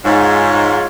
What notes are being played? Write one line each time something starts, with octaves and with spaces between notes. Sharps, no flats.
G#2 F4 C#5